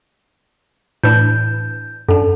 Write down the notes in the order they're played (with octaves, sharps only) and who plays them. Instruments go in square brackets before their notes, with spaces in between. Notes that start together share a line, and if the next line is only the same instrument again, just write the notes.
[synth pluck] A2 E3 D4 [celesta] G6
[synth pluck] F#2 D4 [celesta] A4